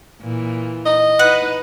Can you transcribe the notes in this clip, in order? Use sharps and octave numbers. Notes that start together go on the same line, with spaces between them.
A#2 E3
D#5
D#4 B4 F#5